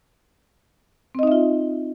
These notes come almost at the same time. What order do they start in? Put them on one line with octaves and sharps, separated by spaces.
C4 D#5 D#4 E5 F4